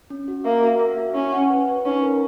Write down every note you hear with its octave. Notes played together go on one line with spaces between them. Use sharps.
C#4
F#4
A#3 E5
F#4
E5
F#4
C#4 E4
F#5
B4
B4
C#4 D#4
A#4